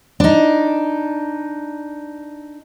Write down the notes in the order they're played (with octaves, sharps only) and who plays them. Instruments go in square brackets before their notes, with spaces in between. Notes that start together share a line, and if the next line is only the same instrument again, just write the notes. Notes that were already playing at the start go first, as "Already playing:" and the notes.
[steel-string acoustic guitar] D4 D#4